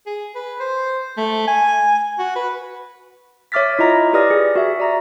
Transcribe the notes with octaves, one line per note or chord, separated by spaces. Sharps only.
G#4
B4
C5
A3
G#5
F#4
B4
C#5 E5 D6 F6 A6 B6
E4 F4 D#5 A#5 A#6
G4 B4 D5 D#6 F6 A#6
G#4
F#4 E5
D5 A#5 A#6